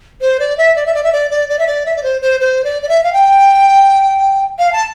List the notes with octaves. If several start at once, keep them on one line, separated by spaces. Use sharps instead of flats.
C5
D5
E5
D5
E5
D5
E5
D5
D5
D5
E5
D5
E5
D5
C5
C5
C5
D5
D5
E5
F5
G5
F5
A5